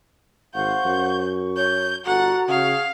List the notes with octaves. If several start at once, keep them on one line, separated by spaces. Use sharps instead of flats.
G#1 C5 F5 F#5 C#6 G6
F#2
C#6
C#5 G6
G1 F#4 A4 F#5 A#5
C#3 G#4 F5 F#5